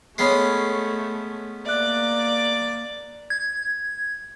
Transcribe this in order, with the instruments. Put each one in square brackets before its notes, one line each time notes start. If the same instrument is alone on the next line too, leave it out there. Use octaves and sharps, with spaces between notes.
[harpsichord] G#3 B3 C#4 [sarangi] A3 [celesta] C#5 B5 C7
[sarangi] A#3 [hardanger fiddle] D5 [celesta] E5 F#6
[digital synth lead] G#6